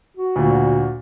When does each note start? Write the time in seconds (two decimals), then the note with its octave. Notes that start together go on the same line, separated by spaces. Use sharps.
0.17 F#4
0.36 D2 A#2